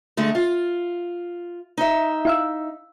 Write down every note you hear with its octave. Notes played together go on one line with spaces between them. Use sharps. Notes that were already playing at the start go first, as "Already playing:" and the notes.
D3 G#3 A3
F4
D#4 E5
E4 F5 E6